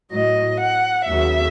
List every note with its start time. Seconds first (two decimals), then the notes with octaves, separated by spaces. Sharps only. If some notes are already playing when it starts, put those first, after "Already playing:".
0.11 A2 F#3 D#5
0.59 F#5
1.07 D#2 C#3 F#3 E5